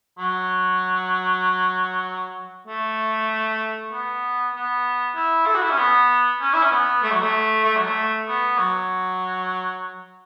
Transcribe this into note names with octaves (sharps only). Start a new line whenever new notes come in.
F#3
A3
B3
B3
E4
A4
F#4
E4
C#4
B3
C#4
E4
C#4
B3
A3
F#3
A3
A3
F#3
A3
B3
F#3